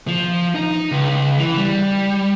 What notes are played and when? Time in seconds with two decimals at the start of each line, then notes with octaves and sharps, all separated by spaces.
0.08 F3
0.55 D#4
0.91 C#2
1.38 E3
1.58 G3